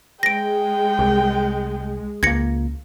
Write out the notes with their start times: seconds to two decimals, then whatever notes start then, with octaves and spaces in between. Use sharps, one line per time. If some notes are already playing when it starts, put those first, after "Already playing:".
0.23 G#3 G5 A#6 D7
0.99 C2
2.23 C#2 A#3 G#6 A#6 C#7